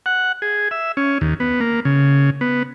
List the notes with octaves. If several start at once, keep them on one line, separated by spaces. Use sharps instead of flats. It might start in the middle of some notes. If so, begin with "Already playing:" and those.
F#5
G#4
E5
C#4
D#2
B3
A#3
C#3
B3